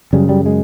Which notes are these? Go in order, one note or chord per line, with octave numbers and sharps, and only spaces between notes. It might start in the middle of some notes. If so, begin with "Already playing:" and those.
F#2 C#3 G3
G3
G#3